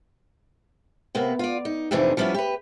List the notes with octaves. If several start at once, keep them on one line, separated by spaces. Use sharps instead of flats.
C3 A#3 B3
F4 D5
D#4
F2 A2 C3 E3 D4 D#4
F3 G3 B3 C#4 E4
G4 B4